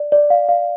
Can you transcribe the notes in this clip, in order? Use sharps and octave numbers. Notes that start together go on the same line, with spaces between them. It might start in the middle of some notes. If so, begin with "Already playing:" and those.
Already playing: D5
D5
F5
F5